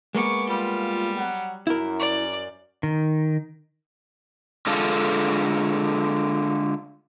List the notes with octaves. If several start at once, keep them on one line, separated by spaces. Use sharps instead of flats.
G#3 A#3 B3 C#6 D6
G3 F4
F#3 F#5
F#2 E4 A#4
D5
D#3
D3 G#3 F4 A4